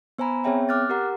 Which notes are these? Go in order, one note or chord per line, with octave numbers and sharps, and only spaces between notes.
B3 C5 G#5 A#5 B5
B3 C4 G#4 C#5 E5 G5
D6 F6 F#6 A6
G4 A#4 F#5 A#5